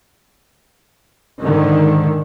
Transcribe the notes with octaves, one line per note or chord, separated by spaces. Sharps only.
G#2 D3 D#3